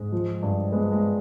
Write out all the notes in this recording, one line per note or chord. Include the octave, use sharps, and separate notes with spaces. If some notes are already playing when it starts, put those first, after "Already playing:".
Already playing: G#2 G#3
F3
G2
G#3 B3
G#3